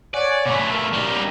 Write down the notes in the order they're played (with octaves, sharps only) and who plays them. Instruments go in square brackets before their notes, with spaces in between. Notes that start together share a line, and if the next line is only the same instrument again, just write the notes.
[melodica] C#5 F#5 G#5 [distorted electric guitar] D5
[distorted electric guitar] B2 A3
[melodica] A#4
[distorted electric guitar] G3 D#4